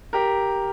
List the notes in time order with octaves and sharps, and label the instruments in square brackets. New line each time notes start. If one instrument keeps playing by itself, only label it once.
[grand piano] G4 A#4